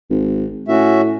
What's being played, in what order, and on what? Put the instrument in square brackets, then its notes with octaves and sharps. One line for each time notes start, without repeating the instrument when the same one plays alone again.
[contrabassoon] G#1
[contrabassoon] A2 [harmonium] C#4 F#4 E5